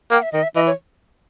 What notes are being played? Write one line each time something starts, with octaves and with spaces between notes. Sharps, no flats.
A#3 G5
E5
D#3 D#5
E5
E3 D#5
C#5